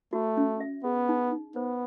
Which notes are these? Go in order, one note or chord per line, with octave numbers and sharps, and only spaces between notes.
A3 F#4
C#4
E5
B3 G#4
D#4
D#4
B3 C5